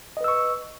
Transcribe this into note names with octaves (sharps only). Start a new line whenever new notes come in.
B4 D#5 C#6 E6